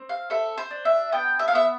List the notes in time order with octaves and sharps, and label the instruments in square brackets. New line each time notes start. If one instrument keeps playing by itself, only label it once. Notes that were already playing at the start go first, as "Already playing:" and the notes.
Already playing: [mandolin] C4
F5
A4 E5
C5
D4
E5
B3 G5
E5
F5
B3 E5